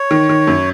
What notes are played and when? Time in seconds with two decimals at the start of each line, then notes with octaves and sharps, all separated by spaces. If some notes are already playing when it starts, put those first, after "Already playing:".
Already playing: C#5
0.11 D#3
0.29 D#3
0.47 F#2